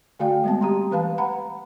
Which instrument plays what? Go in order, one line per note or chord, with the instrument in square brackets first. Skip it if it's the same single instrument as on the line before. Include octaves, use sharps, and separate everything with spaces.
[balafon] D3 A3 F#4 D5 F5 G5
G3 G#3 B3 C4 A5
G4 A#5 C6
E3 B4 F5 A5
F#5 A#5 B5